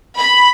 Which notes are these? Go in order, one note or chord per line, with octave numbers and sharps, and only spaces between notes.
B5